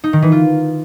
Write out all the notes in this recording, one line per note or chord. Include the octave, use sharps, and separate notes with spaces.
D#4
D#3
E3
F4